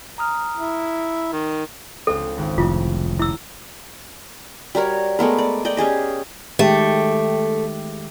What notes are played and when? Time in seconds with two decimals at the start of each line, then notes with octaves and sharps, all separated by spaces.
0.18 A#5 D#6 F6
0.57 E4
1.32 D#3
2.07 C#2 C4 A4
2.38 G#1
2.58 F1 E4 F4
3.20 E4 E6
4.75 G3 F#4 A#4 C#5
5.19 G#3 A3 B3 A#4
5.38 D5
5.65 D5 D#5 G5
5.77 C#4 G4 G#4 D#5
6.59 D#3 G#3 A3 G4